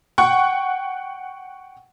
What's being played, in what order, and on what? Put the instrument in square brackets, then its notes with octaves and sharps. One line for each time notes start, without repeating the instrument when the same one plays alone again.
[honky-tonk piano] F#5 G5 C#6